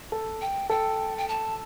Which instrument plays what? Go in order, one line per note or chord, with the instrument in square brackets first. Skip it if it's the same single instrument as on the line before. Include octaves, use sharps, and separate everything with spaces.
[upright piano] A4
[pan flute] G5
[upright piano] A4 [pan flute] G5
[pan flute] G5
A5